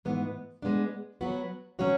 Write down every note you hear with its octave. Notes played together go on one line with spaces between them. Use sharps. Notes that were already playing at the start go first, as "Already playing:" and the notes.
G#2 E3 B3
G#3 B3 D4
F#3 B3 F#4
F#3 C#4 F#4 C#5